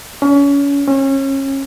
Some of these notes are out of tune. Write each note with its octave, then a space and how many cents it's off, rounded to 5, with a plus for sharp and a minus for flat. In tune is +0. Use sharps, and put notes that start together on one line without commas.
C#4 +30
C#4 -30